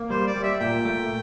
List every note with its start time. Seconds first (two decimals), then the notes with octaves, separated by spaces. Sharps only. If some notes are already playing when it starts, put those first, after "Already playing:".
Already playing: A#3
0.10 G3 C5
0.27 D5
0.35 G3
0.43 E5
0.60 A#2 G5
0.85 A3